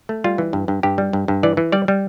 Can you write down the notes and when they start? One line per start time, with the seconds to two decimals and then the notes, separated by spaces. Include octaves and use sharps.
0.09 A3
0.24 G3 F4
0.38 E3
0.53 G2
0.68 G2
0.83 G2 G4
0.98 G3
1.13 G2
1.28 G2
1.43 E3 D5
1.57 E3
1.72 G3 D5
1.88 G3